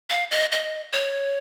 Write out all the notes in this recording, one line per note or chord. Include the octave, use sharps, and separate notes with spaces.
F5
D#5
D#5
C#5